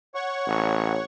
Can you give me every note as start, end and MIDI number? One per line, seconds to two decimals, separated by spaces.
0.15 1.05 73
0.15 1.05 78
0.15 1.05 85
0.47 1.00 33